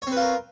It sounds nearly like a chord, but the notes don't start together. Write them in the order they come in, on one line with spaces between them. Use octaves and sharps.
C#5 C4 B4 F4 A#4